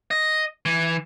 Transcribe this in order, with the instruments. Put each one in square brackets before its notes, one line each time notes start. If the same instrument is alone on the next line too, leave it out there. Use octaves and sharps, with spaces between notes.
[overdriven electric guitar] D#5
E3